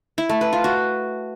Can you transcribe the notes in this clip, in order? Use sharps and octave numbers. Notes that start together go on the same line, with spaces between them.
E4
A3
B4
F4
F#4